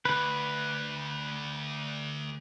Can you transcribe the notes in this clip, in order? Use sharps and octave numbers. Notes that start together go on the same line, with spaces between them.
D2 B4